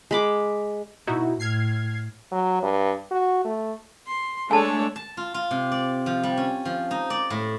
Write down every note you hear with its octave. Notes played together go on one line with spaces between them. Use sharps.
G#3 B5 D6
B2 D#4 E4 F#4
A2 F6 G#6 C7
F#3
G2
F#4
A3
C6
G#3 A3 D4 A4 C#5 G#5 A5
A5
F4
F4
C3
D5
F3
G3
C#4
F3
D#4
D5
A2